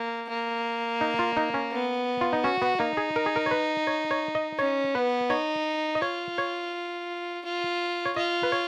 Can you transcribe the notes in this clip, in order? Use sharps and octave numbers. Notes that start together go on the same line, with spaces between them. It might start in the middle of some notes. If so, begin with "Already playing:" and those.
Already playing: A#3
A#3
D#4
F4
D#4
C#4
B3
F4
D#4
C#4 F#4
B3
A#3 D#4
G#4
A#4
G#4
A#4
C#5
B4
C#5
C#5
D#5
C#4 C#5
B3 B4
D#4 C#5
D#5
F4 C#5
C#5
F4
C#5
F4 D#5
B4
C#5